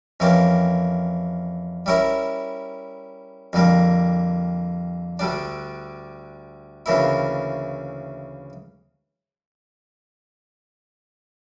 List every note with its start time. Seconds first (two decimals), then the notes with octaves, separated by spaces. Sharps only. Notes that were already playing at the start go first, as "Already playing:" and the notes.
0.20 F2 E3 A#3 C#4 G4
1.86 G3 C#4 E4 A#4 E5
3.53 F2 D3 G3 A#3
5.19 D2 D3 G3 D4
6.86 D2 C#3 E3 A#3 E4